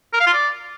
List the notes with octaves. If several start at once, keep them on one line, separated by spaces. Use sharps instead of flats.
A#4
F5
F4
D5